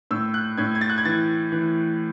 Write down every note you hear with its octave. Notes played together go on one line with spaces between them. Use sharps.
A2 E6
F#6
A2 G#6
G#6
A6
F#6
G#6
E3 A6
E3